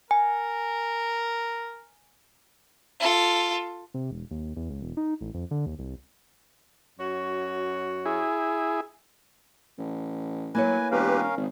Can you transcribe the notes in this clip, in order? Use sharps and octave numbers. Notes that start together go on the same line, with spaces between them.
A#4 G#5
F4 A4
C3
E1
D#2
E2
C#2
E1
D#4
A1
F2
D3
D#2
C2
F#2 F#4 C#5
E4 G#4
A1
F#3 A#3 E4 B4 C#5 G#5
E1 C#4 G4 A#4 B4 F5
G#1 C#3